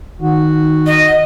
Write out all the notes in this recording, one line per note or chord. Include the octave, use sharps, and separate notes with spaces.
D#3 F#4
D#5